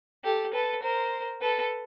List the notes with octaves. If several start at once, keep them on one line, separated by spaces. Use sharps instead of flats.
G4 A4
A4 B4
A#4 C5
A4 B4